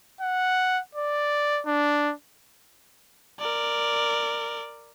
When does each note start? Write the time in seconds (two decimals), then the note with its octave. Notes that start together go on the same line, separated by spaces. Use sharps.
0.21 F#5
0.95 D5
1.66 D4
3.39 A#4 D5